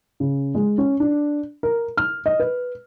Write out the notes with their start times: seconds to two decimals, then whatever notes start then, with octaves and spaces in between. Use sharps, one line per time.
0.20 C#3
0.55 G#3
0.78 C#4
1.00 D4
1.63 A#4
1.97 F6
2.26 D#5
2.40 B4